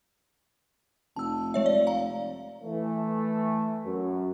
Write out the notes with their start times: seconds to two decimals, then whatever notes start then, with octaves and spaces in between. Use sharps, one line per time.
1.16 F1 A5 E6
1.54 G#3 C#5 E5
1.66 D5
1.87 F5 A#5
2.62 E3 A3
3.84 F#2